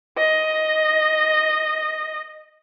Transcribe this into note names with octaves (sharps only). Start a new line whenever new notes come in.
D#5